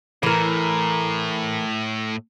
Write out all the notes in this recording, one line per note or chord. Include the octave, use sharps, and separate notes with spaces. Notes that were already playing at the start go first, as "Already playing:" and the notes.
A2 E3 A#4